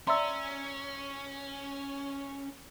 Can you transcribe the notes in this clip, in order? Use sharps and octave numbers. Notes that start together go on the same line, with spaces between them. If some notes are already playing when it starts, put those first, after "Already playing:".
C#4 D5 E5 A#5 C6 E6